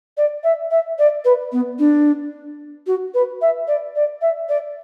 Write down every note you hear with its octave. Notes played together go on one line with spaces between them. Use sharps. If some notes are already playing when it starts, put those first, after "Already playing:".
D5
E5
E5
D5
B4
B3
D4
F#4
B4
E5
D5
D5
E5
D5